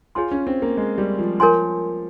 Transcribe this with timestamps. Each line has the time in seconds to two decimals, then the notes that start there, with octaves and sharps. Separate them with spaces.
0.15 F4 G#4 C#5 G#5 C6
0.31 C#4
0.47 C4
0.62 A#3
0.77 G#3
0.98 G3
1.18 F3
1.40 F3 A#4 C#5 G#5 C6